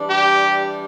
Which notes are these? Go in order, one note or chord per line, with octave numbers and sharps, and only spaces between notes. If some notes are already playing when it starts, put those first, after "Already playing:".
Already playing: E3 G3 D4
G4